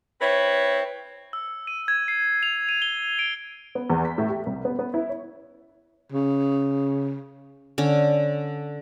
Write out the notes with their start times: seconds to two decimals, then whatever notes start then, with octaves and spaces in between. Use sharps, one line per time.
0.21 C4 E4 B4 C#5
1.33 E6
1.67 D#7
1.88 G#6
2.08 C7
2.43 F7
2.69 D#7
2.82 G7
3.19 D7
3.75 B3
3.90 E2
4.05 B6
4.18 A2
4.29 G4
4.46 C2
4.65 B3
4.79 B3
4.94 E4
5.09 C#5
6.12 C#3
7.78 D3 C#4